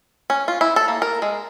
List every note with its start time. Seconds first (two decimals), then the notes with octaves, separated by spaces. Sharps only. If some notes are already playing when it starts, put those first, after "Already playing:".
0.30 C#4
0.48 F4
0.61 E4
0.76 A4
0.88 A#3
1.02 A#4
1.22 G#3